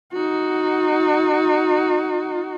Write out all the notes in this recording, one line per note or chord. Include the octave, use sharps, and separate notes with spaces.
D#4 F#4